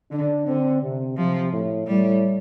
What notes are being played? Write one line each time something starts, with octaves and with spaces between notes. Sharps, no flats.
D3 D4
D3 C4
C3
C3 F3
A2
A2 G3